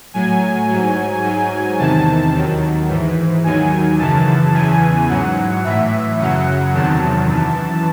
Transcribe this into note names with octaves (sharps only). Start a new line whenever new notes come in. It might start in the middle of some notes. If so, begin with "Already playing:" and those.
A2 F#3 G#5
G#2 F#3
G#2 F#3
E2 C3 D#3 A5
D#2 D#3 F#3
G#2 E3
D#2 D#3 F#3 G#5
F#2 C#3 E3 A5
E2 C#3 E3 G#5
G#2 F#3 F#5
A2 E3 E5
F#2 C#3 F#3 F#5
E2 C3 D#3 F#3 A5
F#2 E3